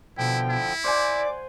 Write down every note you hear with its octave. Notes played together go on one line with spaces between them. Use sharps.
B2 D3 F3 E4 G5
E4
C5 D5 F#5 G#5 D6